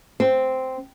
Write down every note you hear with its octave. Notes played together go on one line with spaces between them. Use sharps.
C4